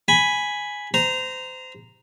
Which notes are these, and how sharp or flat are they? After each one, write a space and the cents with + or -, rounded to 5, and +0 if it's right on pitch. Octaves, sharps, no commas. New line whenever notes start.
G#5 +0 B5 +0
C5 -25 A#5 +0